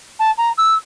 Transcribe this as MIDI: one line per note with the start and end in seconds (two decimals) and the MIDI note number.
0.19 0.30 81
0.37 0.49 82
0.57 0.74 88